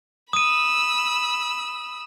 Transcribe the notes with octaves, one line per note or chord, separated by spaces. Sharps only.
B5 D#6 E6 D#7